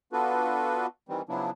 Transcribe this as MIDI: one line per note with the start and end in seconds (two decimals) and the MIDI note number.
0.13 0.87 59
0.13 0.87 62
0.13 0.87 65
0.13 0.87 66
0.13 0.87 69
0.13 0.87 71
1.09 1.22 51
1.09 1.22 52
1.09 1.22 55
1.09 1.22 60
1.29 1.51 49
1.29 1.51 53
1.29 1.51 54
1.29 1.51 59
1.29 1.51 62
1.29 1.51 64